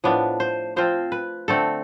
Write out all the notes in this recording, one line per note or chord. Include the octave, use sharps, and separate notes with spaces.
A2 F3 B3 D4
C5
F3 C4 F4 C5
B4
D3 A3 C4 A4